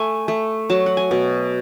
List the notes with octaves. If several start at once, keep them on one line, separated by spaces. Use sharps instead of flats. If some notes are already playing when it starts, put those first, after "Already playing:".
Already playing: A3 G#5
A3
F#3 A5
F#5
G#5
B2